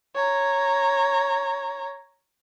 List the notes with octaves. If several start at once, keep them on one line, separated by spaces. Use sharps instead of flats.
C#5 A#5